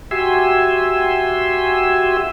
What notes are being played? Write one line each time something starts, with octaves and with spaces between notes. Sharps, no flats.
F#4 G4 E5 G#5 C6 E6